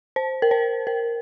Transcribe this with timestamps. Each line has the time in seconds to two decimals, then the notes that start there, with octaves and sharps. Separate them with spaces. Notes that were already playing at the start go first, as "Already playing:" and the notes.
0.16 C5
0.42 A#4
0.51 C5
0.87 A#4